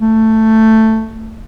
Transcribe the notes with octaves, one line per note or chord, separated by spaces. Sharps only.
A3